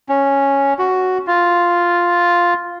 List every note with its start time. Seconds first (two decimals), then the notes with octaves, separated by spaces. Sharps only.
0.09 C#4
0.79 F#4
1.27 F4